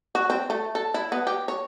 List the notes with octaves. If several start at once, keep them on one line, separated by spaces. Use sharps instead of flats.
F#4
C4
A3
A4
E4
B3
G4
C#5